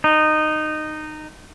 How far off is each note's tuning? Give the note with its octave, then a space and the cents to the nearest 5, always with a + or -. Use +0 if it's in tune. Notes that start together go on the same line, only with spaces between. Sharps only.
D#4 -15